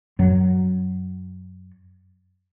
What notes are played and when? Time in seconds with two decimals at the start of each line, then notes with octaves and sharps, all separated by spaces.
0.19 F#2 F#3